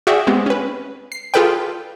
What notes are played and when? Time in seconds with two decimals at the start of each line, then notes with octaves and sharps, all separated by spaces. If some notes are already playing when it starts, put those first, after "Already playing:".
0.07 F#4 G#4 D5 E5 F5 G5
0.27 G#3 B3 C4 G4
0.46 C#4 B4
1.12 C7
1.34 F4 G#4 A4 B4 D5 G5